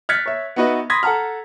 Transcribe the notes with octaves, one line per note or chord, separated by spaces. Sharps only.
F6 F#6 G#6 A6 B6 C#7
C#5 E5
B3 D#4 F#4 B4 D#5 E5
B5 C6 D#6 G#6 A#6 B6
A4 F#5 A5 A#5 F6